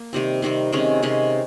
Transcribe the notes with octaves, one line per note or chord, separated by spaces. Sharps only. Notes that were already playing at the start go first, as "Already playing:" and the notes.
Already playing: A#3
C3 D#3 G3 C4
C3 D#3 G3 C4
C3 D#3 G#3 C#4
C3 D#3 G#3 C#4